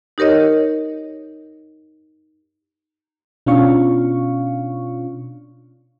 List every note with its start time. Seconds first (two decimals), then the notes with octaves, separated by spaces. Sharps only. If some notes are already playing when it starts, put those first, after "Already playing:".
0.18 D#4 G4 A#4 C#5 D#5
3.46 B2 C#4 D4 F4 F5 C#6